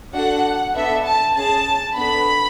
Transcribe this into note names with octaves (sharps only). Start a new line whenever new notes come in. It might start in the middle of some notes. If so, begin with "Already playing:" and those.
D4 F#4 A4 F#5
B3 D4 A4 E5
A5
C#4 G#4 A5
B3 D4 A4 B5